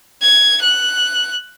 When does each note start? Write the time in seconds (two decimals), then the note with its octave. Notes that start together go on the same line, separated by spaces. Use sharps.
0.22 G#6
0.63 F#6